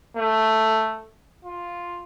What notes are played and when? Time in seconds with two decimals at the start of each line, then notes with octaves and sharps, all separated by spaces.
0.17 A3
1.45 F4